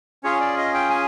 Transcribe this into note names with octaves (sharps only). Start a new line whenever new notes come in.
C#4 F4 G#4 C#5
D5
D#5
G5
G#5